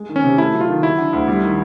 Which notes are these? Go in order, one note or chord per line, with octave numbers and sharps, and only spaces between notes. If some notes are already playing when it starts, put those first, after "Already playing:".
Already playing: G#3
D#3
C#4
C3
A3 E4
F#3
F4
D#3
F#3 E4
D3
D2
G3
D#3